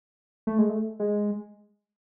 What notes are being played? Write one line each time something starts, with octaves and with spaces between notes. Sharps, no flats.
A3
G#3
A3
G#3